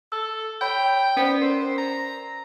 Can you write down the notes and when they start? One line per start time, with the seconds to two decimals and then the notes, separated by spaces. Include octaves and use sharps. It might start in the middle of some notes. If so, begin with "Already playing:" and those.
0.12 A4 E6
0.61 C#5 G5 B5 G6
1.17 B3 C#4 C5 D5
1.41 A#4 C5
1.78 A#5